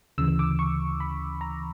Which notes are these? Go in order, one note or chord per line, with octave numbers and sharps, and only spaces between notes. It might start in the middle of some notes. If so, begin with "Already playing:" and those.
D2 C#3 E3 E6
D6
C#6
B5
A#5